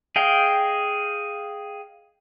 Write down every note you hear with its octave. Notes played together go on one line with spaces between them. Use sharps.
G#4 D#5 F5 G5